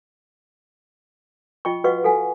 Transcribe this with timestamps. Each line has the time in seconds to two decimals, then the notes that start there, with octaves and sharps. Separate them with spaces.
1.65 F4 D#5 G5 C#6
1.84 F#4 B4 D#5 F5 F#5 C#6
2.04 A4 F5 F#5 G#5